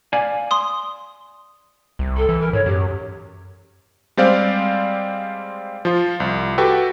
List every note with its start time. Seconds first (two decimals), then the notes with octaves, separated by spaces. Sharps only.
0.13 D5 F5 G#5
0.51 C6 D#6
1.99 C2
2.17 A4
2.29 E3
2.41 A#4
2.53 G#2 C#5
2.66 F#2 G4
4.17 G3 G#3 C4 C5 D5 F5
5.85 F3 F4
6.20 C2
6.58 F#4 G4 A4 B4 G5